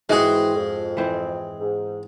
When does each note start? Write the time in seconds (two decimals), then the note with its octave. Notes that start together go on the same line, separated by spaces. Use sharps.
0.09 G#2 E3 G#3 C4 F#4 G#4
0.55 F2
0.97 E3 C4
1.59 G#2